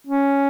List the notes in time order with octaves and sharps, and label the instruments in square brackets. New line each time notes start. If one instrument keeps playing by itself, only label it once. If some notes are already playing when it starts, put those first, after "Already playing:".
[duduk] C#4